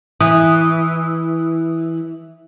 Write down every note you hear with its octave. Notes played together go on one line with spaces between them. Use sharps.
E3 D#6